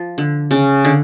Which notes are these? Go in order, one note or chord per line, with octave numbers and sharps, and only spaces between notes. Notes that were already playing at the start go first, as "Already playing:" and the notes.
Already playing: F3
D3
C#3
D3